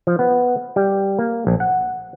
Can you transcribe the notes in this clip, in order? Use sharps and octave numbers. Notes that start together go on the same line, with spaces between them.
F3
B3
G3
A#3
A#1
F#5